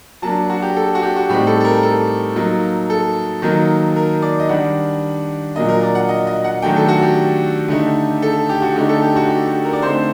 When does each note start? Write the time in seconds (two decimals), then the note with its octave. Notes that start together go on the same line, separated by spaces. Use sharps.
0.22 F#3 A#3 D4 A5
0.50 F#4
0.62 G4
0.76 A4
0.95 F#4
1.02 G4
1.16 F#4
1.29 A2 G3 C4 D#4 G4
1.47 A4
1.61 A4
1.64 A#4
1.83 A4
2.36 F#3 A#3 D#4
2.90 A4
3.42 D#3 F#3 A#3 D#4
3.96 A#4
4.22 D5
4.40 D#5
4.49 D#3 G3 D4 F#5
5.56 A#2 F#3 A#3 D4 D#5
5.69 A#4
5.83 D5
5.95 F#5
6.09 D#5
6.27 D#5
6.44 F#5
6.62 D#3 F#3 A3 D4 G5
6.76 A4
6.88 F#4
7.02 G4
7.68 D3 A3 D#4
8.22 A4
8.49 G4
8.62 F#4
8.76 D3 A3 D#4 G4
8.89 A4
9.02 G4
9.16 F#4
9.29 G4
9.47 G4
9.64 A#4
9.73 D5
9.82 D3 A3 C4 D#4 C5